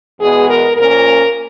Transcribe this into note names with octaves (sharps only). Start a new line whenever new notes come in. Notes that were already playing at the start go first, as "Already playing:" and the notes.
E2 B2 G#3 B3 G#4
A#4
A#2 F3 A#3 C#4 A#4